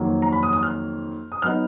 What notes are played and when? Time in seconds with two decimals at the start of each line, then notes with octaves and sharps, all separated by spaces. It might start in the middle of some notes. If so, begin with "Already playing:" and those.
Already playing: F2 D#3 F#3 A#3
0.22 A#5
0.32 B5
0.43 D#6
0.53 D#6
0.63 F6
1.32 D#6
1.42 F#3 B3 D#4 F6